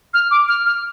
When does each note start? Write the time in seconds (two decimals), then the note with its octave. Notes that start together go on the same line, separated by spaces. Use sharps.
0.14 F6
0.31 D6
0.48 F6
0.66 F6